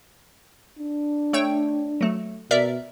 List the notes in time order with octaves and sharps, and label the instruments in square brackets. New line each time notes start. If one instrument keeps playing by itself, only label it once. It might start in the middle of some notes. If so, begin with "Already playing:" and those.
[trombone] D4
[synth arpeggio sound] A3 C#5 G5
F#3 A3
[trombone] B2 [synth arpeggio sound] A#4 D5 E5